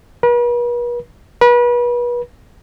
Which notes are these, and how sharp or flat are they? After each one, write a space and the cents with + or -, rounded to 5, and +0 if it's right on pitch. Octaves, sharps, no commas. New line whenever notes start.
B4 -45
B4 -35